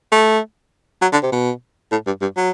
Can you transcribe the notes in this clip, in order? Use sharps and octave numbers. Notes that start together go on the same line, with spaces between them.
A3
F#3
D3
C3
B2
A2
G2
G2
F#3